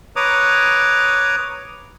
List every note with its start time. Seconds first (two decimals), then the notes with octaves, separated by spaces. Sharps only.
0.16 B4 C#5 A#5 D6 D#6